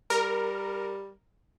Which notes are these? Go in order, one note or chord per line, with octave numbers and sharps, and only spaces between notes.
G3 A#4